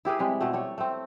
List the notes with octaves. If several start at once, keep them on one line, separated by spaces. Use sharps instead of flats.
E4 G4 G#4 B4
C3 G3 G#3
B2 A3
G3 A3 C#5
A3 C4